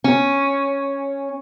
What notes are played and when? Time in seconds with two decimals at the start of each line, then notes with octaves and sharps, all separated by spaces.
0.04 C#4